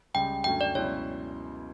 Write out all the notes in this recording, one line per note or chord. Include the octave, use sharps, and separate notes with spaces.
C#2 C#3 G3 G5
F#2 D3 F#3 A3 C#4 G5
D5
C#2 B2 F#3 C#4 E4 C#5